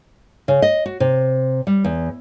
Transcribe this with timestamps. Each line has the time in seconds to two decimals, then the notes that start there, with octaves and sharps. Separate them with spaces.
0.48 C#3
0.62 D#5
0.86 F#4
1.00 C3
1.67 G3
1.84 E2